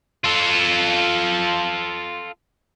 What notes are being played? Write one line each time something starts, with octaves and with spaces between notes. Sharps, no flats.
F4 A4